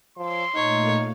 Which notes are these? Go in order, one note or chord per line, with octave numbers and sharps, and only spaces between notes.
F3 C#5 C6 D6 E6
A#2 A3 D#4 C#5 F5